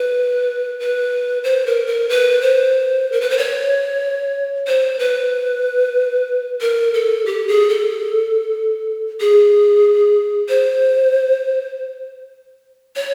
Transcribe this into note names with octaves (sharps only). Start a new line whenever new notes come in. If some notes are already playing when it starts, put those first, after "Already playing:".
Already playing: B4
B4
C5
A#4
A#4
B4
C5
A#4
B4
C5
C#5
C5
B4
A#4
A4
G4
G#4
A4
G#4
C5
C#5